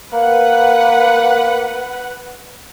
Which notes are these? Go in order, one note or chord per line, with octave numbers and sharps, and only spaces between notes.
A#3 B4 F#5